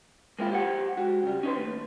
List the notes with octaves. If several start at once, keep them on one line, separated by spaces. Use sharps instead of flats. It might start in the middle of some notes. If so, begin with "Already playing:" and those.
G#3 A#3 C4 E4 F4
G4 C5 F#5
G#3 F#4 G4
C#3 G3
C#4 D#4 G4 B4 C5
D#2 A3